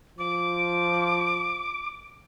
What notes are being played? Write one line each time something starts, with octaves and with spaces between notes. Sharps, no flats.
F3 D6